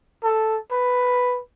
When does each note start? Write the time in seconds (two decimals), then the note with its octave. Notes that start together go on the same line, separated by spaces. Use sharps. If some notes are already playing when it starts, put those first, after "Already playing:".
0.23 A4
0.72 B4